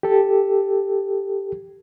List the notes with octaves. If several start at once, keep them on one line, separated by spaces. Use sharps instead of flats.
G4 A4